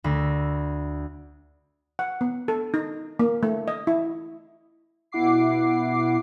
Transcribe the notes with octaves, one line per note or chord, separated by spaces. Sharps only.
D2 B5 E6 A#6
F#5
B3
A4
D#4
A#3
A3
D#5
E4
B2 E4 F#5 D6 C7